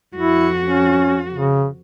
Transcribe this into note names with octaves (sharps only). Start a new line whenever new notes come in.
F2 E4 F#4
C#4
C#3